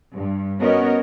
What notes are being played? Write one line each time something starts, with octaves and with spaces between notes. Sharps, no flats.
G2
B3 C#4 F#4 A#4 C#5 D#5